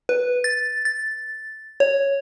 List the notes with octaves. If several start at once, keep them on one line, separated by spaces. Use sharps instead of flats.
B4
A6
A6
C#5